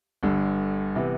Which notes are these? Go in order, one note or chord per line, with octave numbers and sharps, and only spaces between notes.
G1 G2 D3
C3 E3 B3